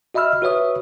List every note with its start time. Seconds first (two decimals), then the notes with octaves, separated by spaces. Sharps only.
0.14 F#4 D#5 E5 B5 E6 F6
0.42 F#4 B4 C#5 E5 D#6